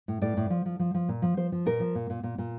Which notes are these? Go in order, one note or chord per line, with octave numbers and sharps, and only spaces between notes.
A2
A2 D5
A2
F3
F3
F3
F3
A#2
F3
F3 C5
F3
A#2 A#4
F3
A#2
A#2
A#2
A#2